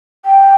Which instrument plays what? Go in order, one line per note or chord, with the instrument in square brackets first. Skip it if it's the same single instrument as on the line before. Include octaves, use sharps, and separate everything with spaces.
[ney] G5